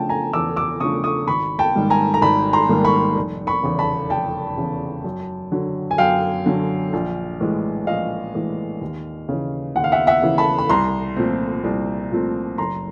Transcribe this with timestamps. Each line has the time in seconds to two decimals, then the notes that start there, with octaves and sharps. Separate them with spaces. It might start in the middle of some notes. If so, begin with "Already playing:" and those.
Already playing: C#3 F3 A3 D4 G5 A5
0.09 G#5 A#5
0.33 E2 D6 E6
0.56 D6 E6
0.80 C#3 F3 A3 D4 C#6 D#6
1.04 C#6 D#6
1.27 G#1 B5 C#6
1.59 G5 A5
1.75 G#2 D#3 G3 A#3
1.90 G#5 A#5
2.14 A#5
2.22 G#1 A5 B5
2.53 A#5 C6
2.69 G#2 D#3 G3 A#3
2.84 B5 C#6
3.16 F1
3.47 B5 C#6
3.63 E2 C#3
3.79 A5 B5
4.10 F1 G5 A5
4.57 E2 C#3
5.04 F#2
5.52 D3 F#3
5.91 G#5
5.98 F#2 F5 G5
6.46 D3 F#3
6.93 A#1
7.40 A2 E3 G#3
7.87 A#1 D#5 F5
8.34 A2 E3 G#3
8.81 D#2
9.29 C#3 E3
9.76 D#2 F#5
9.84 F5
9.92 E5 F#5
10.07 E5 F#5
10.22 C#3 E3
10.38 A5 B5
10.58 B5
10.69 C2 A#5 C6
11.17 A#2 F3 A3 C4
11.64 C2
12.11 A#2 F3 A3 C4
12.58 F#1 A#5 C6